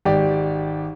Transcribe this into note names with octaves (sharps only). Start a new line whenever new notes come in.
G#1 G4 D5